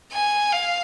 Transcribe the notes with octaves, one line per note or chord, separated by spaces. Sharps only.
G#5
F5